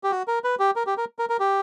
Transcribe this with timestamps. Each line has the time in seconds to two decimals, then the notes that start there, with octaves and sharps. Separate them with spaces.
0.04 G4
0.11 F#4
0.28 A#4
0.44 B4
0.59 G4
0.76 A#4
0.87 G4
0.97 A#4
1.19 A#4
1.30 A#4
1.40 G4